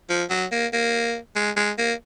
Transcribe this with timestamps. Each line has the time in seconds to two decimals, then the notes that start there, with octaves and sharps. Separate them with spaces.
0.09 F3
0.30 F#3
0.52 A#3
0.73 A#3
1.35 G#3
1.56 G#3
1.78 A#3